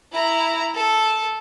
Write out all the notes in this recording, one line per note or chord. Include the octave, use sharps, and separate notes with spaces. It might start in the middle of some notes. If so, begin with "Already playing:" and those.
E4 A#5
A4